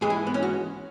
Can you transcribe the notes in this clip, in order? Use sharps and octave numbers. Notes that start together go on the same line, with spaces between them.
G#2 E3 G#3 G#4
E4
B3
C#4
F#4